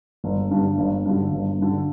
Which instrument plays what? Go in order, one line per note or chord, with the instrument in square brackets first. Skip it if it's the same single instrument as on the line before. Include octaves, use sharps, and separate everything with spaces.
[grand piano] G1
G2 D3
G1
G2 D3
G1
G2 D3